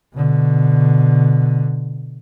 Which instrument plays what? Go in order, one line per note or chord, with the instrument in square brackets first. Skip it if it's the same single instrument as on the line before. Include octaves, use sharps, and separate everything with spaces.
[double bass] B2 D3